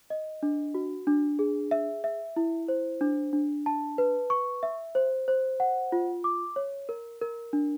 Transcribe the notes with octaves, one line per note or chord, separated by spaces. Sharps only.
D#5
D4
F#4
D4
G#4
E5
E5
E4
C5
D4
D4
A5
B4
C#6
E5
C5
C5
F#5
F4
D6
C#5
A#4
A#4
D4